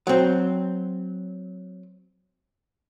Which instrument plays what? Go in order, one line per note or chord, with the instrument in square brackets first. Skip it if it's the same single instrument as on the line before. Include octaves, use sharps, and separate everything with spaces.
[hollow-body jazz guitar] F#3 C4